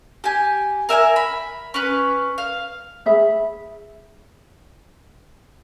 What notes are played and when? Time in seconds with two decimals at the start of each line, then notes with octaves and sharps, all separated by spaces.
0.24 G4 G#5
0.89 A#4 E5 G5 G#5
1.16 B5
1.74 C#4 B4
2.38 F5
3.06 G#4 E5 B5